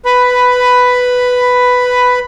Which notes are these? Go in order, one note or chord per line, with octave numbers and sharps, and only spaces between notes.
B4 B5